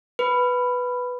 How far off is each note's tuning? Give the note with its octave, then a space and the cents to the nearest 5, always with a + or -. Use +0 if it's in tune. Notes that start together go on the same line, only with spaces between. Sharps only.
B4 +0 B5 +5